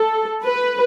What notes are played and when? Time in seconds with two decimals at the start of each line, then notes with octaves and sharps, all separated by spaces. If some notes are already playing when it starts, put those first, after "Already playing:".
Already playing: A4
0.44 B4